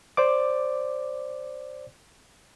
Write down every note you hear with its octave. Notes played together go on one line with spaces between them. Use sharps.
C5 D5 D6